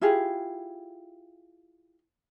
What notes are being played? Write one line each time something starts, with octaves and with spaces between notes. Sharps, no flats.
E4 F4 G4 G#4